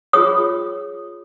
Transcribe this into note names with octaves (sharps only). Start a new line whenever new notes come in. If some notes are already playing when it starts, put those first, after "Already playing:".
F4 G#4 C#5 D#6